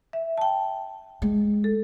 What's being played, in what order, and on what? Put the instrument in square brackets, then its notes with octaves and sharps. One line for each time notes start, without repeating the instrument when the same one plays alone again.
[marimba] E5
G5 A5
[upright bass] G#3
[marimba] A4